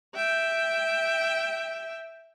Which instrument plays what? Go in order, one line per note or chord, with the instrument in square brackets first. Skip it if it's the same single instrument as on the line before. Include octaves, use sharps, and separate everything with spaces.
[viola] E5 G5